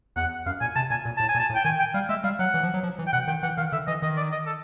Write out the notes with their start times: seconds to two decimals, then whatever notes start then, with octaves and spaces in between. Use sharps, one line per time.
0.16 E2 F#5
0.46 F#2 F5
0.61 A#2 G#5
0.76 C3 A5
0.90 A#2 G#5
1.05 A#2
1.17 A2 A5
1.28 G#5
1.35 A#2
1.39 A5
1.50 A2
1.55 G5
1.65 D#3 G#5
1.79 G5
1.94 G3 F5
2.09 G#3 E5
2.24 G3 F5
2.39 F#3 F#5
2.54 E3
2.63 F3
2.74 F#3
2.83 F3
2.99 E3
3.07 G5
3.13 B2 F#5
3.28 D#3 G5
3.43 E3 F#5
3.57 D#3 F5
3.72 D3 E5
3.87 E3 D#5
4.02 D#3 D#5
4.17 D5
4.32 D#5
4.46 A4